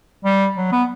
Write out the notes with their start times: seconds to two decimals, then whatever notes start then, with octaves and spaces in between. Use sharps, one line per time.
0.25 G3
0.57 F#3
0.72 B3